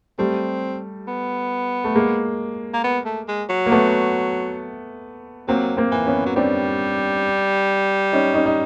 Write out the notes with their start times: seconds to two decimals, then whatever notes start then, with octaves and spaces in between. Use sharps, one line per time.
0.18 G3 A3 C4
1.08 B3
1.84 A3
1.95 G#3 A#3
2.74 A#3
2.84 B3
3.06 A3
3.28 G#3
3.50 F#3
3.66 A#3
3.71 A3 B3
5.48 F#3 A#3 C4
5.77 A#3 C4
5.92 E3
6.06 B3 C#4
6.26 F#3
6.36 G3 C4 D4
8.13 C#4 D#4
8.34 C#4 D#4
8.46 D#4